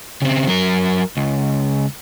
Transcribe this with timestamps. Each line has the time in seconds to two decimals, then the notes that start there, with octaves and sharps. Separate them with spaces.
0.22 C#3 C4
0.47 F#3 A#4
1.17 C#2